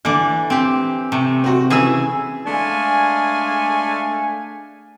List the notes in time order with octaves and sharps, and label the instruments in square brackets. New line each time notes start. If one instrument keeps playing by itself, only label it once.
[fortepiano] D3 [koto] E3 D5
[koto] C4 G4
C3 A3
[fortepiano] C4 F#4
[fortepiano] C#3 E3 E6 [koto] G#4 E5 G#5
[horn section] G#3 A3 D4 F5 G#5